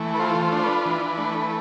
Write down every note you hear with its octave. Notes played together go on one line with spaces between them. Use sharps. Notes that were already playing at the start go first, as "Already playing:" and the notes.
Already playing: E3 A3
B4
F4 C5
C5
D4 C5
B4
E3
A3